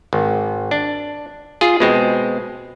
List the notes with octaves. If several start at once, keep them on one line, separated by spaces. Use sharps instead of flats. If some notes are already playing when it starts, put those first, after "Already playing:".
G#1
D4
F4 G#4
B2 G#3 C4